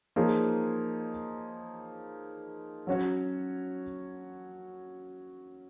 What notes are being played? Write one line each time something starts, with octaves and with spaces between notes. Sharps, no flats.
F3 A#3 D#4 G#4 C#5
F#3 C#4 F#4 C#5